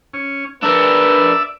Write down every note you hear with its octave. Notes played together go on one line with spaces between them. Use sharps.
C#4
D4 A#4 B4 D5 E5 E6